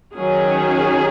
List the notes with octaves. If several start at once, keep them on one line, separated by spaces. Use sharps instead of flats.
D#3 F#3 C#4 G#4